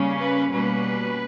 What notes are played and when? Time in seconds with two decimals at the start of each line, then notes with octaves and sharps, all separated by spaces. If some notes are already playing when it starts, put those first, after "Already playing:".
Already playing: C#3 G3 A#3 C#4
0.18 B4
0.51 B2 G3 A#3 C#4 B4